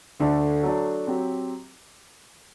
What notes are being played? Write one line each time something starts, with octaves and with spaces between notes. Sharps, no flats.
D2 D3 A3 D4
F#3 A3 D4
F#3 C4 G4